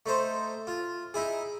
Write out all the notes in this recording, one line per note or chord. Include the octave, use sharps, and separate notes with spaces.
A3 D#4 C5
F4
D#4 E4 G#4